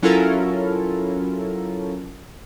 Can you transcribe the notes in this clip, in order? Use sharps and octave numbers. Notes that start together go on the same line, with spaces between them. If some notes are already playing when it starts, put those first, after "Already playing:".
F#3 C#4 E4 F4 A4 A#4